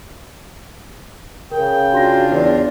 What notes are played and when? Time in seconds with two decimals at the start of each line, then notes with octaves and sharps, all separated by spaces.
1.51 C#3 A#4 G5
1.92 D4 F4 F#4 C6 A#6
2.31 E2 C#5 D5